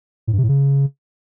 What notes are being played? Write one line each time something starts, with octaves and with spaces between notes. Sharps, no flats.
A2
G2
C3
A2
C#3